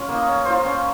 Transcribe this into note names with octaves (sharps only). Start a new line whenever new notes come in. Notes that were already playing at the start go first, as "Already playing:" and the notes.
Already playing: C#4 F4
A#3
D#4
C#4
F4 C5
C#4